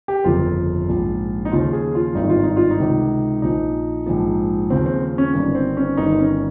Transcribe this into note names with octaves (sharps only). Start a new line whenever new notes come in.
G4
G1 F2 C#3 F4
A#1 G#2 F3
D#4
D#2 C#3 F3 F4
G#4
F4
G#1 G2 D#3 D#4
F4
D#4
F4
D#4
C#2 C3 D#3
A#1 A#2 F3 D#4
A#1 G#2 F3
D#2 C#3 F3 C4
C4
C#4
G1 G2 D#3 C#4
C4
C#4
G1 G2 D#3 D#4
C#4